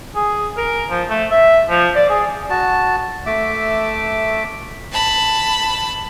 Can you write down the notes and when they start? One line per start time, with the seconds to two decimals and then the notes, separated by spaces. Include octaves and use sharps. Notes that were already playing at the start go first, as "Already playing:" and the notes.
0.15 G#4
0.57 A#4
0.90 F3
1.10 A3
1.31 E5
1.69 F3
1.96 D5
2.10 G#4
2.50 F#4 A5
3.26 A3 E5 D6
4.92 A5 B5